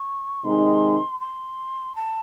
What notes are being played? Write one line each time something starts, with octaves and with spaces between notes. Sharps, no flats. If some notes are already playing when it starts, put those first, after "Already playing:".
Already playing: C#6
C3 D#3 G#3 D#4 C6
C6
A5